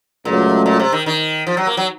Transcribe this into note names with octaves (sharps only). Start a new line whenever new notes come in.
C#2 A#2 C#3 F#3 A3
A#2
C3
D#3
D#3
F3
F#3
A#3
F#3